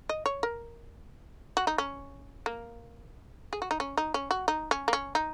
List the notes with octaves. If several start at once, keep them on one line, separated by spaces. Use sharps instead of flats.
D#5
C#5
A#4
F#4
D#4
C#4
A#3
G#4
F#4
D#4
C#4
D#4
C#4
F#4
D#4
C#4
A#3
C#4
D#4